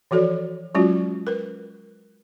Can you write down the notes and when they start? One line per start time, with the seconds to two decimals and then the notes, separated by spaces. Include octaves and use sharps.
0.11 E3 F3 F#4 A4 D5
0.75 F#3 G#3 C#4 F4 F#4
1.27 A#4 B4